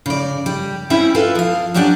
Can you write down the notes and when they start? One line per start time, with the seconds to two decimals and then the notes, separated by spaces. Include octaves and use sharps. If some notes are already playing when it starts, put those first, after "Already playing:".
0.06 C#3 D5
0.46 G3
0.90 G3 C4 C#4 E4 E5 F#5
1.15 F4 A4 B4 F5
1.35 F3 F5
1.74 F#3 C#4 D4 G4 D5 F#5